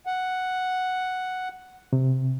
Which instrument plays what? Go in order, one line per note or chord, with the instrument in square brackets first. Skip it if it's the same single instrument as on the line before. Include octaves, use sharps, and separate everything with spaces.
[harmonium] F#5
[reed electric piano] C3